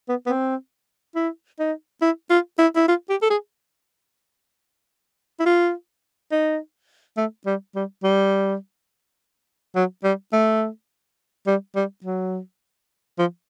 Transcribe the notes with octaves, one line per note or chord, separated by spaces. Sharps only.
B3
B3
C4
E4
D#4
E4
F4
E4
E4
F4
G4
A4
G#4
E4
F4
D#4
A3
G3
G3
G3
F#3
G3
A3
G3
G3
F#3
F3